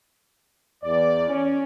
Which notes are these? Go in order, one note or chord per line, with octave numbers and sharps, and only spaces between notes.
E2 D5
C#4